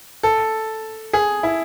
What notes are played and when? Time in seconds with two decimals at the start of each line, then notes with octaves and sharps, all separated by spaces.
0.23 A4
1.13 G#4
1.43 E4